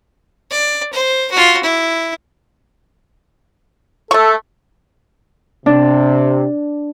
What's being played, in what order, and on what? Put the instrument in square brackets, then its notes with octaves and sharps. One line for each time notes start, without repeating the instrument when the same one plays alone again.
[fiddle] D5
C5
F4 F#4
E4
[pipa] A3 C#6 [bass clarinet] A4
[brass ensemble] C3 [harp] D4